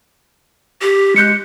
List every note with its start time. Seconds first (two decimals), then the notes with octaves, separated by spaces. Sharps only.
0.82 G4
1.16 G#3 F#6 G6 C#7